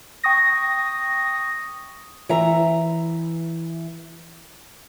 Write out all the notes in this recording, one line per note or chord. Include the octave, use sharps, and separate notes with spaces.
G5 C#6 D#6 A#6
E3 E5 A#5